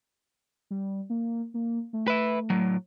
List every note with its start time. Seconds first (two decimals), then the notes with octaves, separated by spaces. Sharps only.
0.71 G3
1.10 A#3
1.54 A#3
1.93 A3
2.08 B4 E5
2.50 A2 F#3